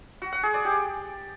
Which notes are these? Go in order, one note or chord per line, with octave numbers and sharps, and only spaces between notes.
F#4
F#5
G#4
D5
G4